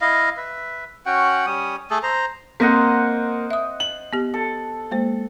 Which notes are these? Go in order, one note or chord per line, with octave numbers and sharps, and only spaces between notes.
E4 D#5 F5
B4 E5
C#4 F#4 F#5 G5
G3 C#4 D#6
A3 G#4 A4
C5 A#5
A#3 C4 C5 D#5 F#5
E5 D#6
F#7
B3 G4
A4
G#3 A#3 C5